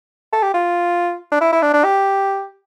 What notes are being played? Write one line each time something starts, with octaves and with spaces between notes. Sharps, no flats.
A4
G4
F4
D4
E4
E4
D4
D4
G4